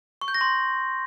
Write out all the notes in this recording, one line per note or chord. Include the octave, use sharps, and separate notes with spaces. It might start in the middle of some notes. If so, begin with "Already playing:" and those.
C#6
G6
A#6
C6